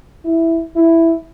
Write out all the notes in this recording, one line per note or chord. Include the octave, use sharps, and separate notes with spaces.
E4
E4